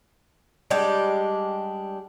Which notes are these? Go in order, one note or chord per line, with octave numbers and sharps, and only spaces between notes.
G3 G#3 D4 G4